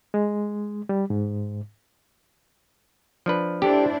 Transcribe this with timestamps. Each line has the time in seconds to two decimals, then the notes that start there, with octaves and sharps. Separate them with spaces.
0.14 G#3
0.89 G3
1.10 G#2
3.26 F3 D4 B4
3.62 D4 E4 G4 A4 C5